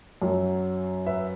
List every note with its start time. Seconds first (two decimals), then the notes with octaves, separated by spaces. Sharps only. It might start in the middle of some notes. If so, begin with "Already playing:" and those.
0.22 F#2 F#3
1.06 B4 E5